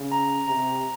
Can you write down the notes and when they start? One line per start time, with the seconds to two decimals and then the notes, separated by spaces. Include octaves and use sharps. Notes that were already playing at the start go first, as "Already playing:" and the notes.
Already playing: C#3
0.12 A#5
0.47 C3 A#5